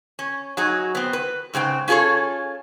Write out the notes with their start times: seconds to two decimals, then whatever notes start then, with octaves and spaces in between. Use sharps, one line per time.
0.19 C#4
0.57 F#3 D#4 F#4 G#4
0.95 B3 C4
1.13 B4
1.54 G#2 C#3 C4 G5
1.88 C#4 F4 G#4 A4 C#5